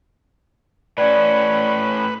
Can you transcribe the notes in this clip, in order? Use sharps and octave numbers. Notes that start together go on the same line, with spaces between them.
A2 C#4 B4 D5 G#6